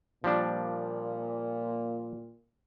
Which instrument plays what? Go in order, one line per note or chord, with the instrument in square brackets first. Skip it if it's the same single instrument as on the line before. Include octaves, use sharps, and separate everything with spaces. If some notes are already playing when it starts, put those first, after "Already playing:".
[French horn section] A#2 [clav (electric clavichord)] F3 G3 D4